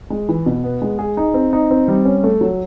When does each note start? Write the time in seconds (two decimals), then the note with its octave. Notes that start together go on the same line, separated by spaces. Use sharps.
0.10 G#3
0.29 E3
0.46 B2
0.64 B3
0.82 G#3
0.99 G#4
1.17 D#4
1.34 C4
1.53 D#4
1.70 C4
1.88 G3
2.05 C#4
2.24 A3
2.41 F#3